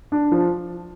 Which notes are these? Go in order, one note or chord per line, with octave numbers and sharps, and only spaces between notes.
D4
F3